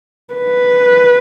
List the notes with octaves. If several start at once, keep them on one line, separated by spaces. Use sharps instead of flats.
B4